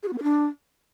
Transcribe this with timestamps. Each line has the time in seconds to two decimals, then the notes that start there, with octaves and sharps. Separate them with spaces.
0.03 G#4
0.08 F#4
0.13 B3
0.18 A#4
0.23 D4